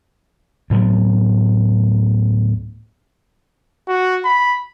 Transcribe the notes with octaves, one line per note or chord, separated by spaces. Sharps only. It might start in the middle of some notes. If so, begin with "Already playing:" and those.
D2 A2 F#3 B3
F#4
B5